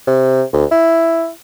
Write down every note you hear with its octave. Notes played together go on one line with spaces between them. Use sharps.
C3
D2
E4